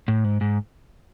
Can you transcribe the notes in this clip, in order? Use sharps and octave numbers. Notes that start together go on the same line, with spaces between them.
A2
G#2
G#2